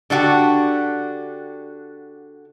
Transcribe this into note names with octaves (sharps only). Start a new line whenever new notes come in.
D3 D4 F#4 G4